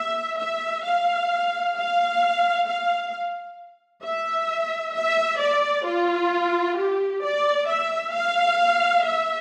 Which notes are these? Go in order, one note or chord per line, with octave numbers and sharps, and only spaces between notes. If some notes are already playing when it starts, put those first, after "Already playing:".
Already playing: E5
E5
F5
F5
F5
E5
E5
D5
F4
G4
D5
E5
F5
E5